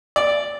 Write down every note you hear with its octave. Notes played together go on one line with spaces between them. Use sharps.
D5